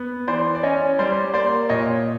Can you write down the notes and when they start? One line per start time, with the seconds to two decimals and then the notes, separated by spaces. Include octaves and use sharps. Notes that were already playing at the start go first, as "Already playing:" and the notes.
Already playing: B3
0.28 E3 C5 D5
0.55 D5
0.63 C#4 C#5 D#5
0.99 G3 C5 D5
1.34 A#3 C5 D5
1.69 A#2 C#5 D#5